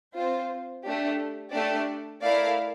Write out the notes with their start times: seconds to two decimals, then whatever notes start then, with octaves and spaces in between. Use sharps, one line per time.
0.15 C4 F4 C5
0.84 A3 D4 G4
1.53 A3 D4 G4 D5
2.22 A3 E4 A#4 D5 F5